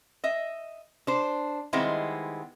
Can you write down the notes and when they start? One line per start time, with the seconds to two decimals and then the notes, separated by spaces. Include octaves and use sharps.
0.24 D#5 E5
1.07 D4 C5
1.73 D#3 G3 G#3 B3 C4 E4